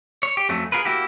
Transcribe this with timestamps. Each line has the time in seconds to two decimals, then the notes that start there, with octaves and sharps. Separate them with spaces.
0.23 C#5
0.37 G4
0.49 F2 F#3 A3 C#4
0.72 F4 F#4 G#4 A#4 B4
0.85 A#3 E4 F#4 G4